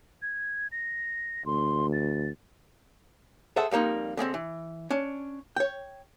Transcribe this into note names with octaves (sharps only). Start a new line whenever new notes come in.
G#6
A#6
D2 C6
A6
G#4 A4 C5 E5 F#5 A5
F2 G3 A#3 D#4 C6
D3 G#3 A3 C4
E3
C#4 D4
C#5 G5